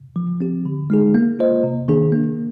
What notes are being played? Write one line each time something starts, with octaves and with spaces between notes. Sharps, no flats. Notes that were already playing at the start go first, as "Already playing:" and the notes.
F3
C4 G4
D3
G#3 D#4 G#4
A#3
F4 C5 D#5
C3
D#3 A#3 D4 G#4
A#3